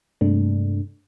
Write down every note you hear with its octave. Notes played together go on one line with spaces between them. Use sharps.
G2 C3 G#3 A3 D4